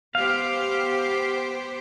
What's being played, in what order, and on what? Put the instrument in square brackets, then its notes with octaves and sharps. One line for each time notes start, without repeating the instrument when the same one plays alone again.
[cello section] B3 G4 C5 [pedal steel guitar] F5